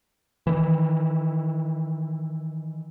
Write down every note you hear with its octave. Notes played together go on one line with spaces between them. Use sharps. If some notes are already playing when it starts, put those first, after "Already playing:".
D#3 E3